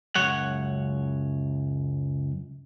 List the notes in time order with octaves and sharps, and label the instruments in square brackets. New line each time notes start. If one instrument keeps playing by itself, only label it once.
[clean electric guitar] C#2 F#2 C#5 F#5